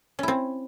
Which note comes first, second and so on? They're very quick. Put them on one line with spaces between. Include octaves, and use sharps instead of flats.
C#4 E4 C4